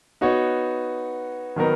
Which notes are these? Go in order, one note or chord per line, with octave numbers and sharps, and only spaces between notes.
B3 D#4 F#4 C#5
D#3 F#3 B3 D#4 A#4